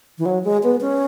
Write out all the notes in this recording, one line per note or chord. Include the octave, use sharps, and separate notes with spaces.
E3
F#3
G#3
B3
C#4